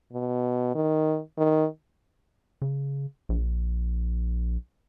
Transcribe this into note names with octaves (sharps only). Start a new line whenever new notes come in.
B2
D#3
D#3
C#3
A#1